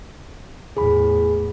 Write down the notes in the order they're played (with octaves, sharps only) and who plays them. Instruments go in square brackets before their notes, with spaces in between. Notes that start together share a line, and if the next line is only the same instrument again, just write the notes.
[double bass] E2 A2 [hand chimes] G#4 B5